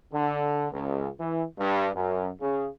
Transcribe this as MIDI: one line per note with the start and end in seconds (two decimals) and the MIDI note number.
0.13 0.67 50
0.72 1.09 37
1.20 1.44 52
1.59 1.89 43
1.95 2.30 42
2.41 2.68 49